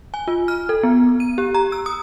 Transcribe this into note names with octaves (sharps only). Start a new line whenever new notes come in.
G#5
F4
F6
A4
B3
D#7
G4
A#5
E6
D#6